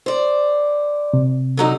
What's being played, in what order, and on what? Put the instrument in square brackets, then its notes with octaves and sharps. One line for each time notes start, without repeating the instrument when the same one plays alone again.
[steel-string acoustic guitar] C5 D5
[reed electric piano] C3
[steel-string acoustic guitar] D3 F#3 D#4